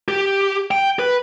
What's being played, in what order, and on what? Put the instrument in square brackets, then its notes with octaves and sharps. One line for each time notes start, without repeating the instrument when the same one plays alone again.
[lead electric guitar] G4
G5
B4